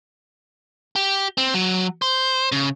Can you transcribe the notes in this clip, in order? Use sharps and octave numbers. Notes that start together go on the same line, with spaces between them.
G4
C4
F#3
C5
C#3